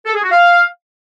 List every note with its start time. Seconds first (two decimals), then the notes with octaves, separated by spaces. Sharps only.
0.06 A4
0.15 G#4
0.23 F#4
0.32 F5